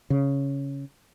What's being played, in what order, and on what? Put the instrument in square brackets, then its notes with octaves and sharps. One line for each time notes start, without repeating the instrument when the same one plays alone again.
[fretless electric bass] C#3